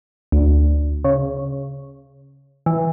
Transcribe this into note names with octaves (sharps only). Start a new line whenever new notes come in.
D2
C#3
E3